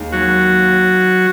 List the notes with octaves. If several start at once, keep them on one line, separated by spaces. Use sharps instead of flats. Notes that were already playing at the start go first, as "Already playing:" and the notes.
Already playing: D#2 D#3 G#3
F#3 F#4